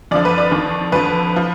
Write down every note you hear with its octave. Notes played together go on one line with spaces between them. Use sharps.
F2 D3 F3 D5
B4
D5
F2 D#3
F2 D3 F3 B4
F3